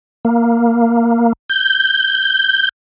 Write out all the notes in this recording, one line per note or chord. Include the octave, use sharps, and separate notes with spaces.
A#3
G6